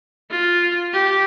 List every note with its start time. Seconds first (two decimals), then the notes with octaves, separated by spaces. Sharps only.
0.31 F4
0.93 G4